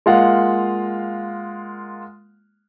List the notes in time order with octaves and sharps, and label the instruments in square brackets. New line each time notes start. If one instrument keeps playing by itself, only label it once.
[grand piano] G#3 A#3 F4 F5 F#5